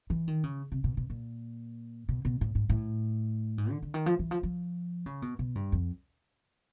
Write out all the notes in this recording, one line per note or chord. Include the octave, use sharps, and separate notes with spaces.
E3
D#3
C#3
C3
B2
B2
A#2
B2
B2
A2
G#2
A2
G#2
D3
D3
D#3
F3
E3
F3
F3
C#3
B2
B2
G2
F2